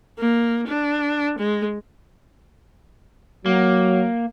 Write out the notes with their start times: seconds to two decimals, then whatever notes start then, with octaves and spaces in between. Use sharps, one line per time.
0.18 A#3
0.67 D4
1.39 G#3
3.46 F#3 A#3